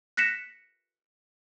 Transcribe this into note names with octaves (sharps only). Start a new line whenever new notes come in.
F#6 A#6 B6 C#7 E7